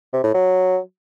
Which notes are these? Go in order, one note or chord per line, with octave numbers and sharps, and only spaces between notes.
C3
A2
F#3